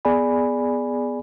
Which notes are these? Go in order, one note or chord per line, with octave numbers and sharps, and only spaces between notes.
B3 G#4 D5 G#5 B5